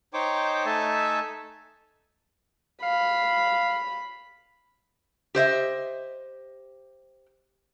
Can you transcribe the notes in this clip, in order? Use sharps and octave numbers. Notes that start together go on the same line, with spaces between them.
D#4 C5 C#5 G5 D6
A3 D#4 A4 E5 G#5 A5
F5 B5
G4 C5 D#5 E5